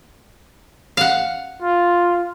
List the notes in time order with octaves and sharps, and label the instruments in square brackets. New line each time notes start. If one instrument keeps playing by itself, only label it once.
[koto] F5 F#5
[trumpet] F4